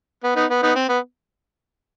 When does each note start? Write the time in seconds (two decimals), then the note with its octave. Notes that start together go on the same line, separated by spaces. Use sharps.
0.23 B3
0.36 B3 D#4
0.50 B3
0.63 B3 D#4
0.76 C4
0.89 B3